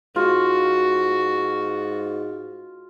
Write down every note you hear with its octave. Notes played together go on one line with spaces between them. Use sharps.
G#2 F4 F#4